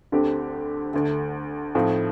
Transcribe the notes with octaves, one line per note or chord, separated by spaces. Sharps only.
D2 D3 A3 C4 G4
D2 D3 A3
A2 F3 C4 D#4